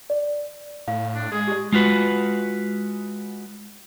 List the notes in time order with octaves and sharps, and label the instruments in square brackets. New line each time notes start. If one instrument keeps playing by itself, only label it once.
[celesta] D5
[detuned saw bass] A2 [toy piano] F5
[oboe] D4
[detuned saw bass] G#3 [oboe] G#4
[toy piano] G4 D5
[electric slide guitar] G#3 F4 F#4 B4